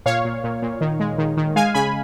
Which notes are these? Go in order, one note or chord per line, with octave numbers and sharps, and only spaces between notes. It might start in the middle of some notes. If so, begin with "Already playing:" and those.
A#2 C#5 F5
A#2
A#2
A#2
D#3
G#3
D#3
D#3
G#3 F5 G#5
C#3 G#5 B5